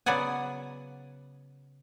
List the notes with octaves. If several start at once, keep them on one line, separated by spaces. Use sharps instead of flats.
C#3 F#3 B3 D5 F#5 G#5